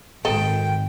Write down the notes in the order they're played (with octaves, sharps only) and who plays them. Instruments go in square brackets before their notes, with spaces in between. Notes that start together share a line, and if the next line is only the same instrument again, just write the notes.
[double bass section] G#1 [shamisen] A4 D#5 [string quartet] G5